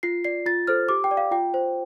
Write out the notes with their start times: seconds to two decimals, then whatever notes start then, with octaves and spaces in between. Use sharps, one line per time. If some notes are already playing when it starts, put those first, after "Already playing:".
0.03 F4 C7
0.24 D5 C7
0.46 F4 A6
0.67 A4 C5 F6
0.89 G4 D6
1.04 G5
1.11 D5
1.17 F5
1.31 F4 G5
1.54 C5